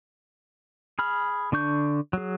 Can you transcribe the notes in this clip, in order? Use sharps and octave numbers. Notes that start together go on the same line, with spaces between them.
G#4 B5 F6
D3 D4 C#6 G6
F#3 G#4